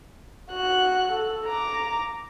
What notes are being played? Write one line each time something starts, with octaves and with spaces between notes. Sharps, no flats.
F#4 F#6
A4
A#5 D6